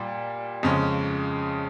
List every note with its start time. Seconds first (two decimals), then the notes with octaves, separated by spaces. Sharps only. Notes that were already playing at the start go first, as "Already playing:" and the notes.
Already playing: A#2 G3
0.63 F2 C#3 G#3 C#4